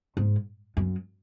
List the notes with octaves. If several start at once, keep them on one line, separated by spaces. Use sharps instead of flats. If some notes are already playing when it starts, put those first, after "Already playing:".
G#2
F#2